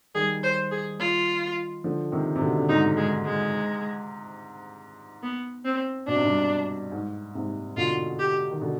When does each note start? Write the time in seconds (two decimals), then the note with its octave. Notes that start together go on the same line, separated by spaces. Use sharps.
0.15 D#3 G3 G#4
0.43 C5
0.71 G#4
0.99 F4
1.84 D3 F3
2.12 C3 D#3
2.36 C3
2.41 B2 D3
2.58 D3
2.69 G#2 C3 D#4
2.97 G#3
3.25 G#3
5.23 B3
5.65 C4
6.07 B2 D4
6.16 C3
6.24 G2 B2
6.92 G#2
7.35 G#2 C3
7.77 B2 D3 F4
8.19 G4
8.51 D#3
8.61 B2 D3